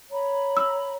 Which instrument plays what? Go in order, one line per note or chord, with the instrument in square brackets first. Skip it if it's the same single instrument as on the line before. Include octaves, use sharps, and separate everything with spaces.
[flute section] C#5 A#5 B5
[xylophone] E6